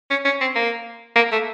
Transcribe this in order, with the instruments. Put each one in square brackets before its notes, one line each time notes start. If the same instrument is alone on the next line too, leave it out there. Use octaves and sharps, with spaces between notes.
[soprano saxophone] C#4
C#4
C4
A#3
A#3
A3